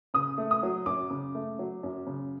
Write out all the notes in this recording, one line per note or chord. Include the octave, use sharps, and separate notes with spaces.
C#3 D#6
A3
D#6
F#3
F#2 D6
C#3
A3
F#3
F#2
C#3